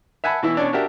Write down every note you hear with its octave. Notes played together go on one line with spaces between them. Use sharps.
E5 F#5 G#5 A5 B5
B2 E3 E4
B2 C#4 D4
D4 F#4 G4 A#4 E5 A5